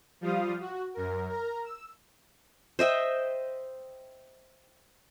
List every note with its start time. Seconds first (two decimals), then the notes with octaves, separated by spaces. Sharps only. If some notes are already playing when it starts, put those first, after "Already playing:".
0.21 F3 G3 F4 F5 D#6
0.61 F#4
0.94 F#2 A#4
1.30 A#4 A#5
1.64 E6
2.79 C5 D#5 E5 G5